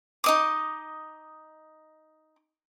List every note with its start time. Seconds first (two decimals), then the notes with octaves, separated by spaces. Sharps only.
0.24 D#4 D#5 D6